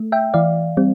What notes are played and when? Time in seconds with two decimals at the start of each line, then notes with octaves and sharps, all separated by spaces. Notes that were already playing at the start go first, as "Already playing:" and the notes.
Already playing: A3
0.12 E5 G5
0.34 E3 D5 F5
0.77 G3 C4